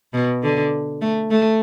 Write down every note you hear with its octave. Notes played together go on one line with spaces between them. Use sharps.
B2
D3
A3
A3